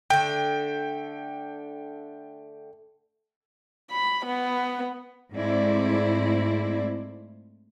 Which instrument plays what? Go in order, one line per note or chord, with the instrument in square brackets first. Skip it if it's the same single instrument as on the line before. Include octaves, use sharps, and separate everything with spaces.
[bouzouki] D3 A3 [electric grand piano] G5
[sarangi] B5
B3
[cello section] G#2 G#3 A3 C4 E4 D5